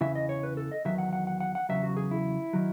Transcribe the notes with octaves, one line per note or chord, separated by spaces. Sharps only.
E2 C#3 E3 E5
D#5
C#5
B4
A4
D#5
E2 D#3 F#3 E5
F#5
F#5
F#5
F#5
F#5
E2 C#3 F#3 E5
F#4
G#4
E4
D#3 F#3